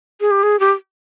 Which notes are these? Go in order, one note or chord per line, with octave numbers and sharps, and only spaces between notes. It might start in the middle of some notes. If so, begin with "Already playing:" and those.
G#4
G4
G#4
G4